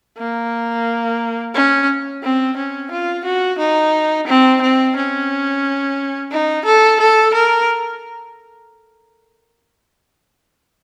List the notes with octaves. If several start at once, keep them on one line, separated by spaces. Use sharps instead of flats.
A#3
C#4
C4
C#4
F4
F#4
D#4
C4
C4
C#4
D#4
A4
A4
A#4